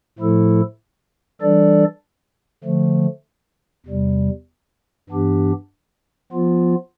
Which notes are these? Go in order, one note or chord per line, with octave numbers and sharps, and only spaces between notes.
A2 F3 A3 E4 A4
E3 G3 D4 A4 D5
D3 F3 A3
E2 C3 G3
G2 E3 B3 D4 G4
F3 B3 F4